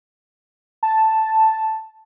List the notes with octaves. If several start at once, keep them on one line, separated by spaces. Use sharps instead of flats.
A5